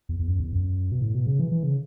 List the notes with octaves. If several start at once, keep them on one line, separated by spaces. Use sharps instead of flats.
E2
E2
F#2
E2
F#2
B2
A2
B2
C#3
E3
E3
C#3